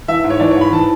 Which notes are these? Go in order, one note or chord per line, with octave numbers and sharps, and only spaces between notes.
E3 E5
G#2
C#5
E3 D5
C#5
G#2 B5
E3 A5